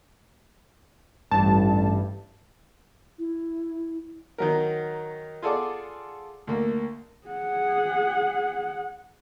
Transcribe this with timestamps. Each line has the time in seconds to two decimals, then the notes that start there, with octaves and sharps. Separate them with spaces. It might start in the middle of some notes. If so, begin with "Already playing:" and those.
1.31 A1 G2 A5
3.19 E4
4.38 D#3 F#3 A#4
5.42 F4 G#4 A4 D5 F#5 D6
6.47 D2 A#3
7.27 G#4 F#5